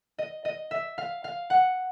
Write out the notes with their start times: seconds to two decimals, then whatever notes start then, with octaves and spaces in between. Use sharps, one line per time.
0.18 D#5
0.45 D#5
0.71 E5
0.98 F5
1.24 F5
1.50 F#5